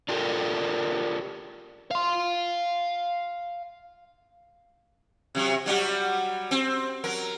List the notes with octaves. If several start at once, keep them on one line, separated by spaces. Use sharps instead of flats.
D4 F4 G4 A4 A#4
F5 C6
C3 F#3
F#3 G3 F#4
C4
F#3 A#4